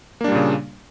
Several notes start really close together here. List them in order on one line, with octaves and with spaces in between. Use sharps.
A#3 D4 G3 A#2 C#3